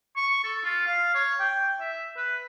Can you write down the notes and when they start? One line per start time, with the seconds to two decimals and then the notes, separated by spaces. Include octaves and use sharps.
0.16 C#6
0.43 A4
0.64 F4
0.86 F5
1.14 C#5
1.40 G5
1.80 E5
2.17 B4